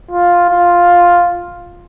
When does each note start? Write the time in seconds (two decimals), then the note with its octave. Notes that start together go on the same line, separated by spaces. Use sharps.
0.11 F4
0.50 F4